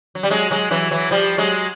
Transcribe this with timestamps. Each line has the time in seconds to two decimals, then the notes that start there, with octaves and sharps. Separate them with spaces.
0.15 F#3
0.23 G3
0.30 F#3 G#3
0.51 F#3 G#3
0.71 E3 F#3
0.91 E3 F#3
1.11 F3 G3
1.38 F#3 G#3